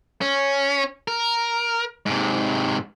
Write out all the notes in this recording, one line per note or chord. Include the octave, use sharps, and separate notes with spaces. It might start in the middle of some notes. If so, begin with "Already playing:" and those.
C#4
A#4
G#2 C3